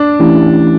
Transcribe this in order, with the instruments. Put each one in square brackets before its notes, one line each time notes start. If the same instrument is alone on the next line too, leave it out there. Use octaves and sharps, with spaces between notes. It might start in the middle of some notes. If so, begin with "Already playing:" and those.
Already playing: [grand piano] D4
[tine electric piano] E3 A3 C#4 E4 G4